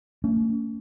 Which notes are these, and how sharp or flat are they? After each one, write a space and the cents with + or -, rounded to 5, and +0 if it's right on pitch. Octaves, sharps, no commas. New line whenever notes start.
A3 +45 C#4 +35